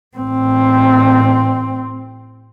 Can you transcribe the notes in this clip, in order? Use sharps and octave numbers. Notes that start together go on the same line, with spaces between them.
A1 C4